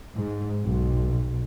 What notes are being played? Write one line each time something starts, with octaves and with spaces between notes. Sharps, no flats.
G#2
B1